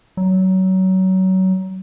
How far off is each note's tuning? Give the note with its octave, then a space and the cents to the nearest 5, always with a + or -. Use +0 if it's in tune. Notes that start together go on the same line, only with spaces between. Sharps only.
F#3 +25